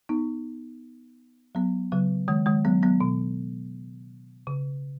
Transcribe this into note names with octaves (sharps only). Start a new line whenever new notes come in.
B3 D#4
F#3 B3
C#3 F#3
D#3 G#3
D#3 G#3
F#3 B3
F#3 B3
B2
C#3